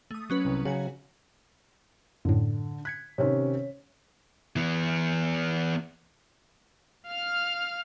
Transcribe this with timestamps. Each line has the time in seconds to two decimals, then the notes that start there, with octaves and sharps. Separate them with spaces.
0.11 A3 D#6
0.30 F#3 C#4 B4
0.45 C2
0.65 C#3 F#3 F#4 G#5
2.25 F#2 A2 D3
2.85 F#6 G#6 B6 C#7
3.18 C3 D#3 C#4 C#5
4.56 E3 B3
7.08 F5 F6